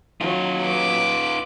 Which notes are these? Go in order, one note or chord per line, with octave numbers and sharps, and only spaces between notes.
F#3 D#4 F4
B4 D6